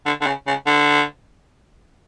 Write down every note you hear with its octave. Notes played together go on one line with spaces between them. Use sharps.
D3
D3
C#3
C#3
D3